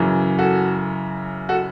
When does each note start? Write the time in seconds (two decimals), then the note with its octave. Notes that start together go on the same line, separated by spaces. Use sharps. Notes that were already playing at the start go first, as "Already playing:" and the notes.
Already playing: F#2 C#3 E3
0.38 F#4 A4
1.49 F#4 A4